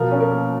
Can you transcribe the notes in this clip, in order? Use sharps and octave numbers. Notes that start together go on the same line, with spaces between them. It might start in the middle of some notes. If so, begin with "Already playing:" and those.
Already playing: B2 F3 A#4
C#4
A#4
A#3